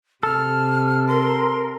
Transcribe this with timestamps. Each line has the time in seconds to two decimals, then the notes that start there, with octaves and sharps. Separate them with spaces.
0.23 C3 A4 F6
1.08 A#4 C6